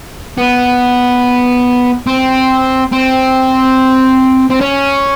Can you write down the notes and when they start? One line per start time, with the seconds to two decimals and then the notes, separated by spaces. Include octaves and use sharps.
0.38 B3
2.07 C4
2.92 C4
4.50 C4
4.61 C#4